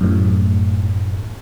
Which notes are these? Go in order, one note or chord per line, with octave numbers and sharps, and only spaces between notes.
F#2 A2